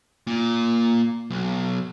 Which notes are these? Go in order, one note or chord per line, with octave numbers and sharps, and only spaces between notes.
A#2
B1